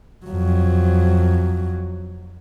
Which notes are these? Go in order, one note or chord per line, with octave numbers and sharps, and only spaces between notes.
F2 F#3